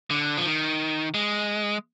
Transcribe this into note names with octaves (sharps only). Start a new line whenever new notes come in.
D3
F3
D#3
G#3